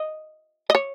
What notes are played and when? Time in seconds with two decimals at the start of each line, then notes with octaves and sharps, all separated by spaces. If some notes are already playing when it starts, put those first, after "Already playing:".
Already playing: D#5
0.70 D#5
0.75 C#5